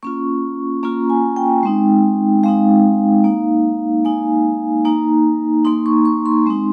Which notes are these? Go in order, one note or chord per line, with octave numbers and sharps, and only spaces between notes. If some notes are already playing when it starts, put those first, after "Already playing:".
A#3 C#4 F4 C#6
A#3 C#4 F4 A#5
G#5
G5
G#3 C4 D#4
G#3 C4 D#4 F5
A#3 D#4
A#3 D#4 G#5
A#3 D#4 A#5
A#3 D#4 C6
C#6
C#6
C6
G#3 C4 D#4